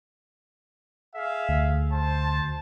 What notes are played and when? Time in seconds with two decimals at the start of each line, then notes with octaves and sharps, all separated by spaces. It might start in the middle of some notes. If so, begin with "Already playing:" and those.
1.15 G#4 E5 F5
1.49 D2
1.92 C5 A5